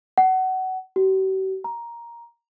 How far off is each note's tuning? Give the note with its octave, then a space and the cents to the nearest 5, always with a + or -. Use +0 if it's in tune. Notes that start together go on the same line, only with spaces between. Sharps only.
F#5 +25
G4 -45
A#5 +10